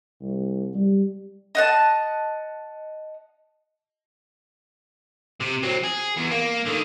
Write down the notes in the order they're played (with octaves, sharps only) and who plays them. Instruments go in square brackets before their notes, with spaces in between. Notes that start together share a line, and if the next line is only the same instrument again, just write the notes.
[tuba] C2
G3
[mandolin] D#5 F#5 A5
[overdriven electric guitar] C3
F#3 C4
G#4
E2
A#3
D3 D#3